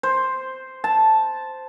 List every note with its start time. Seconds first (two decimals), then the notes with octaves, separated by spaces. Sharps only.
0.03 C5
0.84 A5